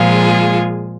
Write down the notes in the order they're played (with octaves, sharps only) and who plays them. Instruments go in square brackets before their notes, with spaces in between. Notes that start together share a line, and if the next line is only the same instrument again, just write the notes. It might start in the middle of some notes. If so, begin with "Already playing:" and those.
Already playing: [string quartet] A#2 F3 G#3 F4 G#4